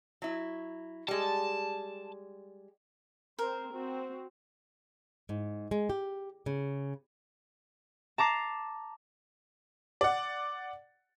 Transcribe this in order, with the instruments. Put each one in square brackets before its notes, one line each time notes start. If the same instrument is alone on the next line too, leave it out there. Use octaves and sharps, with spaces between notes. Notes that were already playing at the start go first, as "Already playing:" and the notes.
[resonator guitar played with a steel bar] F#3 E4
[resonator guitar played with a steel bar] G3 G#3 [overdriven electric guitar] A5
[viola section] C4 C5 [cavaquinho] A#4
[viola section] C4 F#4
[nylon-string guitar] G#2
G#3
G4
C#3
[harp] A5 A#5 D6 C7
[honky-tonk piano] D5 F#5